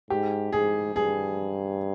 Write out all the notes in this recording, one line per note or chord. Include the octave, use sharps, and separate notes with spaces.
G#2 G4
G#2 G#4
G2 G#4